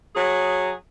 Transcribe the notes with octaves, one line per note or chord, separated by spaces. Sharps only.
F#3 G#4